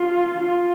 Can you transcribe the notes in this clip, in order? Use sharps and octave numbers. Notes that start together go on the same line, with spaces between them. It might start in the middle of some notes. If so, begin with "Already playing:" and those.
Already playing: F4
F4